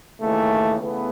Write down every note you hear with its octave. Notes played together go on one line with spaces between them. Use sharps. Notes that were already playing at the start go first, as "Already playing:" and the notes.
D#2 C#3 E3 A3
C#3 E3 A3 B3